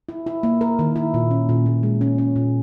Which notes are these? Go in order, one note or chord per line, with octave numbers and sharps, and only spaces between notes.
E4
E4
A#3
A#4
D#3
E4
A#2
C#4
A#2
A#2
G#3
C#4
C#4
A#2